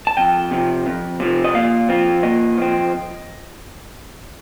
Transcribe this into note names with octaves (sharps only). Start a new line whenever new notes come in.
A5
F2 G5
C3 F3
F2
C3 F3
D#5
A#2 F5
F3 C4
A#2 D#5
F3 C4